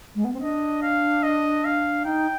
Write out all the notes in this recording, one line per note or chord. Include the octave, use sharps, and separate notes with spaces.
G#3
B3
C4
D4 D#5
F5
D#5
F5
D#4 G5